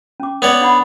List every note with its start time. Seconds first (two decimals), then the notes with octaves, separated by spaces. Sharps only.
0.20 C#4 D6
0.42 B3 C#5 D5
0.61 D4 F#5 B5